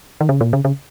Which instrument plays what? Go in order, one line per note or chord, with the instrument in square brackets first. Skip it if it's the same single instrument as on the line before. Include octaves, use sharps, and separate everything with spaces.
[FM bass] D#3
C#3
A#2
C#3
C#3